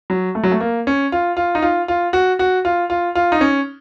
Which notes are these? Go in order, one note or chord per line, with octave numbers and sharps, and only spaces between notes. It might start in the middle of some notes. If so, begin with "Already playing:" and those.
F#3
A3
F#3
A3
A#3
C#4
F4
F4
D#4
F4
F4
F#4
F#4
F4
F4
F4
D#4
C#4